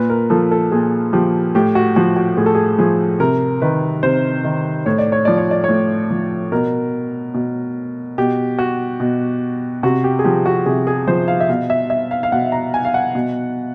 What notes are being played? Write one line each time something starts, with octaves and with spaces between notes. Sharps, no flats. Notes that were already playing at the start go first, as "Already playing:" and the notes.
Already playing: A#2 B4
A#4
F3 A4
A4
A#2 G#4
F3 G4
A2 G4
F#4
F3 F#4
F#4
A2 G#4
A4
G#4
F3 G#4
C3 A#4
D#3 B4
C3 C5
D#3
A2 C#5
D5
C#5
F3 D5
C#5
D5
A2 C#5
F3
B2 A#4
B2
B2 G4
F#4
B2
C3 F#4
G4
G#4
F3 G4
F#4
C3 G#4
G#4
F3 C5
F5
E5
B2 F5
E5
E5
F5
F5
B2 F#5
A#5
G#5
F5
F#5
B2